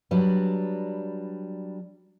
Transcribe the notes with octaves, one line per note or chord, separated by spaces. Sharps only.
F#3 G3 D4 B4